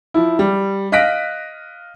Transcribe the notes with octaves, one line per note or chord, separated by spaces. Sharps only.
F3 E4
G3
D#5 F5 F#6 A#6 B6 D7